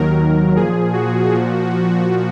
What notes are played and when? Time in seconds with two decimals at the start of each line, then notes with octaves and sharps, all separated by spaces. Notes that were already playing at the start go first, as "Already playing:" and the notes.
Already playing: D#2 D#3 F#3 A#4
0.56 A#2 F3 G#4
0.93 F#4
1.31 A#2 F3